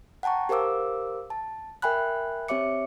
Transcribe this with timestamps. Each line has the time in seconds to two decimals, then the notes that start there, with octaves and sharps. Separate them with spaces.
0.23 F#5 G5 A5 A#5 C#6
0.49 G4 A#4 C5 F5 D6 E6
1.30 A5
1.82 A#4 E5 G5 G#5 B5 F#6
2.48 C4 G4 C#5 E5 D6 C#7